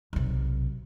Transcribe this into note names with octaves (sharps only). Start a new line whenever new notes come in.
B1 C3